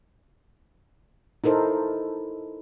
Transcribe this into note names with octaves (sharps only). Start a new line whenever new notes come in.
D#4 E4 A4 A#4 C5